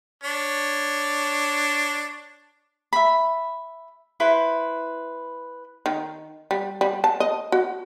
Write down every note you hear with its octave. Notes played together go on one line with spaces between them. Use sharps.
D4 C#5
E5 B5
E4 B4 C5
D#3
G3
G3
A5
D#5
F#4